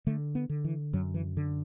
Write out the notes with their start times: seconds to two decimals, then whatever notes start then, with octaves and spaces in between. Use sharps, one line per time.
0.07 D3 A3
0.35 B3
0.49 D3
0.65 E3
0.93 F#2 F#3
1.14 E3
1.37 D3